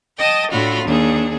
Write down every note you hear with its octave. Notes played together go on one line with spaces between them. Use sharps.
D#5 G5 A5 D#6
A2 D4 F4 F#4 B5
D#2 D4 G#4